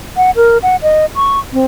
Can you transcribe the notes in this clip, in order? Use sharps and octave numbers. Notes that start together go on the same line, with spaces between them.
F#5
A#4
F#5
D#5
C#6
C4